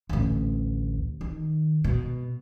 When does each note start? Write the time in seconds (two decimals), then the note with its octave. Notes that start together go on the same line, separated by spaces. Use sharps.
0.09 A1 D2
1.21 D#3
1.84 B2